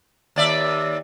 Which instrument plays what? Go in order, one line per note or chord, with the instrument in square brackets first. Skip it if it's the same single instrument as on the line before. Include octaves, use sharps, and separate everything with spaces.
[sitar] D#2 D5 E5